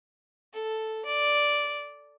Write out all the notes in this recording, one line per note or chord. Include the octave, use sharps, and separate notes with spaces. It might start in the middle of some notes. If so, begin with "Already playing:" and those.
A4
D5